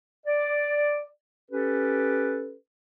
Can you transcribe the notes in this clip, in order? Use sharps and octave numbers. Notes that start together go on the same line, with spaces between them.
D5
C#4 G4 A4 B4